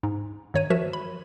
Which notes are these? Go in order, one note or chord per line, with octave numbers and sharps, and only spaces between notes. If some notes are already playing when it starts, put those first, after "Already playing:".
G#2
G2 D#3 C#5 A#5 D#7
F3 F#4 A#4 E5 E7
B5